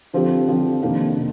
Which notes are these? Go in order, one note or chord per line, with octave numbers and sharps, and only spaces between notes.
D3 F3 C4 G4
D3 F3 C4 G4
F2 C3 D#3 A#3 D4
C3